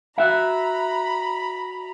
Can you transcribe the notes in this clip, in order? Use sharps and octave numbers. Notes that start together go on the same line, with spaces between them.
F#4 E5 A#5 B5